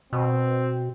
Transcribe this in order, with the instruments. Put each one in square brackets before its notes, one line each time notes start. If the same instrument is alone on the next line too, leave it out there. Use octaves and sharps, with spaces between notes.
[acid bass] B2 [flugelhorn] C4